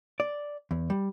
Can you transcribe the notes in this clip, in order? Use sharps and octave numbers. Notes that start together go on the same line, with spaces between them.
D5
E2
G3